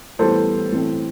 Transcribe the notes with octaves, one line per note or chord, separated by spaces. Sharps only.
A2 E3 G3 B3 A4 C5
A2 E3 A3 C4